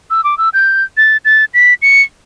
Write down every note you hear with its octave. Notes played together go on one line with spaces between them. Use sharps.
E6
D6
E6
G6
A6
A6
B6
C#7